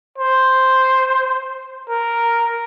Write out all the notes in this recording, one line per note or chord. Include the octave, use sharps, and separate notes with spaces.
C5
A#4